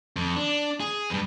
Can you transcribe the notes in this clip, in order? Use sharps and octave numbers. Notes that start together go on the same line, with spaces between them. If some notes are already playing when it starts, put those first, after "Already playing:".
F2
D4
G#4
E2 G2